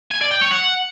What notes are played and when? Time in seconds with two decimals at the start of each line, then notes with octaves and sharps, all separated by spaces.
0.11 G#5
0.21 D5
0.31 G5
0.41 C#5
0.51 F#5